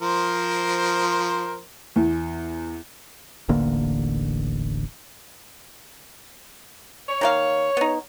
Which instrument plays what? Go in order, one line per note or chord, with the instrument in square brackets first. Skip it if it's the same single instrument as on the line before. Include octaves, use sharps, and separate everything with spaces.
[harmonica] F3 A#4 C5
[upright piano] E2
[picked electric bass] D#1 A1 D3 A#3
[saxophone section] C#5
[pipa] D#3 A#3 F5
B3 D#4